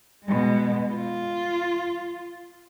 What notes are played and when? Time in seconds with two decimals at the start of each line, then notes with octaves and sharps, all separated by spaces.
0.24 B2 G#3
0.94 F4